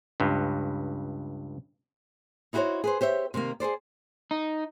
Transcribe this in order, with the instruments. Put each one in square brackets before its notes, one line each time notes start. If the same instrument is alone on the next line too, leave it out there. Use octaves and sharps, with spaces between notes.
[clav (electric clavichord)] C#2 G2
[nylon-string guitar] D#4 E4 F#4 G4 C5 C#5
G#4 B4 C5
G4 C5 C#5 E5
C3 D#3 G#3 A#3
G#4 A4 C5 D5
[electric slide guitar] D#4